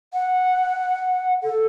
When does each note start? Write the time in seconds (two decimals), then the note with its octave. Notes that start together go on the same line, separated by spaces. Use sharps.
0.14 F#5
1.43 A4